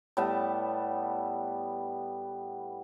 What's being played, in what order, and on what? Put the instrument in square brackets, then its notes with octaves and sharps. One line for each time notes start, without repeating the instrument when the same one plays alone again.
[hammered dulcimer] A2 G3 B3 A5